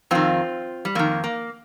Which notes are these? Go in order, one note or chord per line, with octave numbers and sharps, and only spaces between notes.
F2 D#3 C4 F4
G3
F2 D#3 A#3
A#3